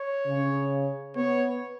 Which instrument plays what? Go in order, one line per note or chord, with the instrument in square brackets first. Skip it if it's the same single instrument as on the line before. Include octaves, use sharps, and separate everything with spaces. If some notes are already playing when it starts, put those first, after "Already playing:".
Already playing: [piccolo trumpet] C#5
[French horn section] C#3
[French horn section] B3 [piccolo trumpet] C#5